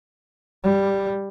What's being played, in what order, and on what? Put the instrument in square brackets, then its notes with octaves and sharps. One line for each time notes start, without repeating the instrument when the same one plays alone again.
[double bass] G3